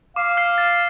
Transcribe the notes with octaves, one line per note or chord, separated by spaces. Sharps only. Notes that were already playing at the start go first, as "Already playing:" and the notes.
F5 D6
F6 C7
A6